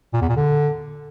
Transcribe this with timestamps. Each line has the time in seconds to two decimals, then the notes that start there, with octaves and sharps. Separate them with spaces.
0.14 A#2
0.21 E2
0.29 A#2
0.37 D3